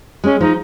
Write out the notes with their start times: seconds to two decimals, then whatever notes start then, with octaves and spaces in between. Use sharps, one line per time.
0.24 G#3 C#4
0.40 F3 D#4